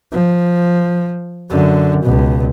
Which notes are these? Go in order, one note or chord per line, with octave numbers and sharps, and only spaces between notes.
F3
F#2 D3
C#2 B2